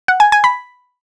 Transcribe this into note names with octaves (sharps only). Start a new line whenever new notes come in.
F#5
G#5
G#5
B5